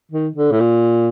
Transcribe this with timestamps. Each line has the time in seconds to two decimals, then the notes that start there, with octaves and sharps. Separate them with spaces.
0.11 D#3
0.36 D3
0.52 A2
0.60 A#2